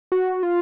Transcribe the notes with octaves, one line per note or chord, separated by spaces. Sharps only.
F#4
F4